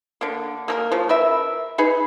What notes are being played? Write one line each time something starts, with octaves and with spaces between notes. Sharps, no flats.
D3 A#3
A#3 A4 A#4
C#3 F3
A#4 B4 E5
D#4 G#4 B4